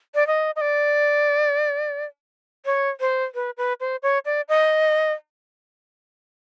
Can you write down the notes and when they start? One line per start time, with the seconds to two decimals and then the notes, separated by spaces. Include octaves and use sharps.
0.15 D5
0.27 D#5
0.56 D#5
0.61 D5
2.66 C#5
3.00 C5
3.35 B4
3.57 B4
3.80 C5
4.03 C#5
4.25 D5
4.49 D#5